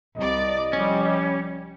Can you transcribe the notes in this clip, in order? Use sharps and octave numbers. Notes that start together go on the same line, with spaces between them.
C2 D5 D#5
F3 G3 C#4